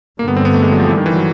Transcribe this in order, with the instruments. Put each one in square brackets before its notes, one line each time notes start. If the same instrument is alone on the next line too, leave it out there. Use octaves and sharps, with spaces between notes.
[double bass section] G2 D3 G3 [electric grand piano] A#3
[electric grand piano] B3
C4
B3
A3
G#3
F#3
F3
E3
D#3
E3
F#3